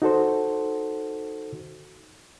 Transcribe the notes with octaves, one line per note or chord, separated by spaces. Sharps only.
D#4 F#4 A4 C5